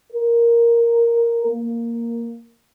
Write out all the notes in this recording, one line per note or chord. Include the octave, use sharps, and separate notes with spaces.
A#4
A#3